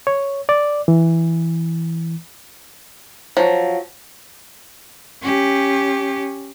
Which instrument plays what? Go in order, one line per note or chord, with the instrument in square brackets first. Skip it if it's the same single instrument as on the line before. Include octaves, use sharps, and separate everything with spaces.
[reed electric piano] C#5
D5
E3
[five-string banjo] F3 F#3
[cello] C#4 G4